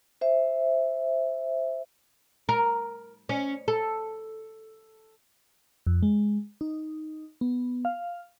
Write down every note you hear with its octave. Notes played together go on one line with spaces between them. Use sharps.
C5 E5
A#4
C#4
A4
F2
G#3
D#4
B3
F5